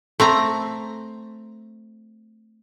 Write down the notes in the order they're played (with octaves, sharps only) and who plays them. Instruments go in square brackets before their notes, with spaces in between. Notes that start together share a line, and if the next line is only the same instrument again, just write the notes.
[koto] A3 C4 A#5